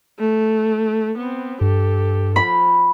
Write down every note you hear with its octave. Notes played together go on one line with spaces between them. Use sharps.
A3
B3 C4
G2 G4 A4
F3 B5